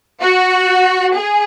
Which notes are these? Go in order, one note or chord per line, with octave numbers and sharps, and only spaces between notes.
F#4
G#4